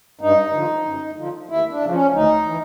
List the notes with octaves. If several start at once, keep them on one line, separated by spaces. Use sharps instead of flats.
G2 D#4
D3 F3
F#2
D3 F3
D#2 E4
D4
C#3 F3
C#4
D2 D#4
E3